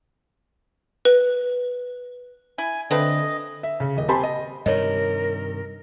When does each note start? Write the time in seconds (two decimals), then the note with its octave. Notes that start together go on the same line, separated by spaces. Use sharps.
1.05 B4
2.58 E4 G#5
2.91 D3 A3 C4 B4 D#5
3.63 E5
3.80 C#3
3.97 D#1 D#5
4.08 C4 G4 G#5 A5 B5 C6
4.23 D#5
4.66 G2 C3 D#3 A#4 C#5 D#5